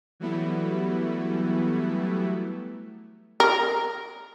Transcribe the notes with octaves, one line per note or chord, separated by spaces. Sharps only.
E3 F#3 G3 A3 B3 E4
A#4